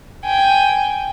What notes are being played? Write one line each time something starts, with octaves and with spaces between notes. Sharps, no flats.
G5 G#5